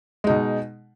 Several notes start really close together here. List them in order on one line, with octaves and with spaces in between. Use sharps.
G#3 D#4 B2